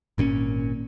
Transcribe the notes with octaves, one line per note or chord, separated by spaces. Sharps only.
G#1 A#2 C4 C#4